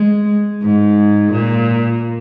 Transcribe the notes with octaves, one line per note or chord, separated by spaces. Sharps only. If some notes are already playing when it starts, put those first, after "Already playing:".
Already playing: G#3
G#2
A#2